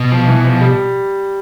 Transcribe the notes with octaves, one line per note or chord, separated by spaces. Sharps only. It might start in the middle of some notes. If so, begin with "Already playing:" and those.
Already playing: B2
F3
E3
F3
G3